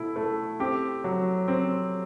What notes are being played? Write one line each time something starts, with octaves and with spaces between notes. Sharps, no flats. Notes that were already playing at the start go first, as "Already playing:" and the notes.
Already playing: B2 A3 E4
A3
C4 G4
F#3
C4